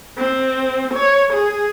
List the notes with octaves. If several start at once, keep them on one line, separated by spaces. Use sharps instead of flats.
C4
C#5
G#4